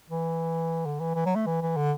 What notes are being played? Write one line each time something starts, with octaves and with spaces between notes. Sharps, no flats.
E3
D3
E3
E3
F#3
A3
E3
E3
D3